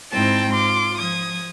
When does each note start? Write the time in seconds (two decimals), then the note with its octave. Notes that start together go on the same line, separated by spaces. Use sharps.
0.11 G#2 C4 E4 G5 A5
0.52 F4 C6 D6
0.98 F3 D#6 G#6